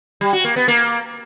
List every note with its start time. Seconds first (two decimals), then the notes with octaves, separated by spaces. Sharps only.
0.21 G3
0.33 F#4
0.44 A#3
0.56 B3
0.68 A#3